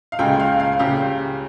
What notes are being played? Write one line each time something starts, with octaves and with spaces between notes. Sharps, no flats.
F5
C#2 C#3 G#3 G5
F5
F5
C#2 C#3 G3 G4